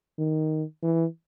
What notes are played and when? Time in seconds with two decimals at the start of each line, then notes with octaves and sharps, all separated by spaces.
0.19 D#3
0.83 E3